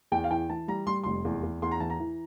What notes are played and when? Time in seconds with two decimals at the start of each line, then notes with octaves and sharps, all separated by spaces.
0.12 E2 G5
0.24 F5
0.31 E3 G5
0.49 E3 A5
0.68 G3 A#5
0.87 G3 C6
1.04 F1 C6
1.25 E2
1.43 E2
1.62 E2 C6
1.71 A#5
1.80 E3 A5
1.90 A#5
2.00 E3